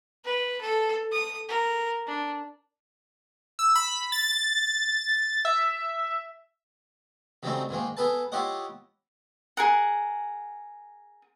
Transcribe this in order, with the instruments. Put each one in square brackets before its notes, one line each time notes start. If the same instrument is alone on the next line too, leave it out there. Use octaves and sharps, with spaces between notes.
[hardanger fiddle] B4
A4
D#6
A#4
D4
[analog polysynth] E6
B5
A6
E5
[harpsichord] C#3 F#3 G3 A3 C4 D#4
G#2 D#3 G#3 A#3
B3 G#4 A4 B4 A5
E4 F4 G4 C#5 D#5 F#5
[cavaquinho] G#4 A#4 F#5